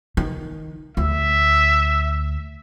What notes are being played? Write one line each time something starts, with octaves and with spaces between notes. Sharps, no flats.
D#3
D2 E5